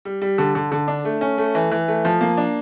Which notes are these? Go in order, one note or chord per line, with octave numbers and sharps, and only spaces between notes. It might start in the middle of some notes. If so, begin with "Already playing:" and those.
G3
G3
D3
D3
D3
D4
A3
C#4
A3
E3
E3
A3
F3
A#3
D4